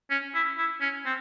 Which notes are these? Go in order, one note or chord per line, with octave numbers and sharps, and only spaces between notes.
C#4
E4
E4
C#4
C4